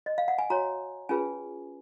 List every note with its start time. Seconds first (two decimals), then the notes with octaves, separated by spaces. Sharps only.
0.06 D#5
0.18 F5
0.28 F#5
0.38 G#5
0.50 F#4 C#5 A#5
1.09 C#4 F4 G#4 B4 G#5